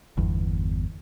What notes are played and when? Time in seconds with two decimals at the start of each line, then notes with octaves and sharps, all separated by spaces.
0.17 G1 E2